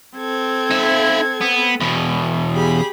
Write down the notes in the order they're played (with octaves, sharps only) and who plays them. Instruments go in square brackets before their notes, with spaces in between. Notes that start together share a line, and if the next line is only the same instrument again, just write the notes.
[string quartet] C4 A4 G#6
[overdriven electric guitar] D#4 E5
B3
E2 B2
[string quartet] G4 G#4 B5